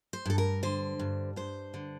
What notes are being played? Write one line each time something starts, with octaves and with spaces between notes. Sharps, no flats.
C5
G2 A4
A#4
D3 C5
G2
G2 C5
D3